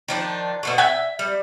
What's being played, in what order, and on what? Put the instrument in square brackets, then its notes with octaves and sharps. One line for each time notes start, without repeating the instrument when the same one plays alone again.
[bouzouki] D#3 F3 D4
B2 D3 A3
[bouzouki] E5 [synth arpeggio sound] F#5 G5 G#6
[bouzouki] G3